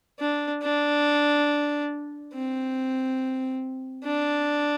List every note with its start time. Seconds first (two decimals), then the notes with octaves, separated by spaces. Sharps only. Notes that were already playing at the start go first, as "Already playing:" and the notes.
0.19 D4
0.62 D4
2.33 C4
4.04 D4